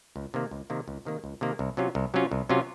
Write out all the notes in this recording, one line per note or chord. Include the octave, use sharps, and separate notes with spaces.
C#2
C3 D#3 A#3
C#2
C3 D#3 A#3
C#2
C3 D#3 A#3
C#2
C3 D#3 A#3
C2
C3 F#3 C#4 F4
C2
C3 F#3 C#4 F4
C2
C3 F#3 C#4 F4